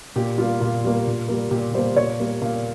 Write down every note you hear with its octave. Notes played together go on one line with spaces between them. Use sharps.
A#2 G4
G3 A#3 F4
A#2 F4
G3 A#3
A#2
G3 A#3
A#2 G4
G3 A#3 C5
A#2 C#5
G3 A#3
A#2 F5